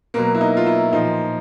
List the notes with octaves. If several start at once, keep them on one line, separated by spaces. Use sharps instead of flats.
B2 F#3 A#3
E4
D#4
F4
E4
A#2 F3 D#4